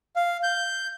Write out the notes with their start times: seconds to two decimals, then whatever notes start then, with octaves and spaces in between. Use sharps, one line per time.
0.16 F5
0.43 G6